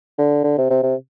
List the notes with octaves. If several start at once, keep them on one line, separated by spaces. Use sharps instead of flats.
D3
D3
C3
C3
C3